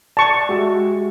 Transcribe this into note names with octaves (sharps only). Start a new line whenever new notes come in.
D5 A5 C#6
G#3 F#4 G4 E5